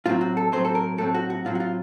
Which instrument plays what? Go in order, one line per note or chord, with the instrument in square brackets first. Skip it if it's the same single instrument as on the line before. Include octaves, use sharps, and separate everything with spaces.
[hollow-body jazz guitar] A2 F#3 C4 F4
F#4
A4
A2 F#3 C4 C5
A4
A#4
A2 F#3 C4 A4
F#4
F#4
A2 F#3 C4 F4
F#4
F4